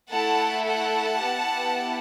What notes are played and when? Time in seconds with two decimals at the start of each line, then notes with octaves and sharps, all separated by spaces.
0.11 A3 E4 A4 F#5 A5
0.67 F#5 A5
1.22 B3 E4 G4